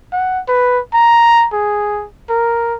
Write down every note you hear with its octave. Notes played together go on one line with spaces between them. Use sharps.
F#5
B4
A#5
G#4
A#4